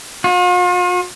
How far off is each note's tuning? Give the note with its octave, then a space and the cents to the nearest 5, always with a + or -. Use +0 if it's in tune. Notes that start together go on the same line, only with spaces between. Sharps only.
F4 +45